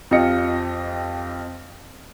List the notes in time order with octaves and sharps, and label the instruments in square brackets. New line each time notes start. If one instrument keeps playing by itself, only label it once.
[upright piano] F2 F4 G4 D#5 C#7